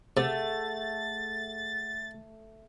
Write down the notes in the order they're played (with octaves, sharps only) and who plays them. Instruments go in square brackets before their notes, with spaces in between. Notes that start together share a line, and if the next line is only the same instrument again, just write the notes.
[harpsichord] C3 [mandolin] A3 [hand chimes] G#4 F#5 [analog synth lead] A6